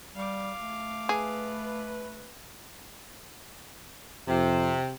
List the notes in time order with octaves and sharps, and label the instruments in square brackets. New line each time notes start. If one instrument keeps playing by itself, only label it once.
[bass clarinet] G3 [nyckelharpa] F5 D6
[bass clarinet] A3
[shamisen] G#4 [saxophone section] B4
[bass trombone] F2 [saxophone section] C3